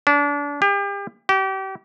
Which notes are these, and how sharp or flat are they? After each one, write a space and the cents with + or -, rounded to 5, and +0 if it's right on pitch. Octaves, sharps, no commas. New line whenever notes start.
D4 -30
G4 +35
G4 -35